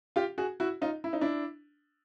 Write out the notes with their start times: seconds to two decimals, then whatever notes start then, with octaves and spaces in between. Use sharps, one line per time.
0.16 F4 G4
0.38 F#4 G#4
0.60 E4 F#4
0.82 D#4 F4
1.04 E4
1.13 D#4
1.21 D4 E4